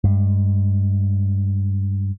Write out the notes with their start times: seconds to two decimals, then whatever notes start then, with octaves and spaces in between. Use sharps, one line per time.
0.04 G2 G#3